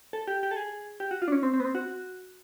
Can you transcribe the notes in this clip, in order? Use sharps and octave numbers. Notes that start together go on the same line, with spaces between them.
A4
G4
G4
A4
G#4
G4
F#4
F4
D4
C#4
C4
C4
B3
C4
F#4